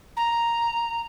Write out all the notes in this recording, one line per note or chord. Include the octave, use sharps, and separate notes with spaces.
A#5